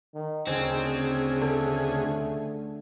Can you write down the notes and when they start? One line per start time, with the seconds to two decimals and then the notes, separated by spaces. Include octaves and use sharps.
0.14 D#3
0.47 D2 C#3 C4 D#4 G#4
1.42 D3 A3